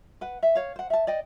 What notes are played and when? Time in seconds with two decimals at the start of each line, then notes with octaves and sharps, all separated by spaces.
0.21 B4 F#5
0.43 E5
0.55 C#5 F5
0.76 C5 F#5
0.90 E5 A5
1.07 D5 D#5 G5